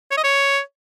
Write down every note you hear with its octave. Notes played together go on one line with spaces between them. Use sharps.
C#5
D#5
C#5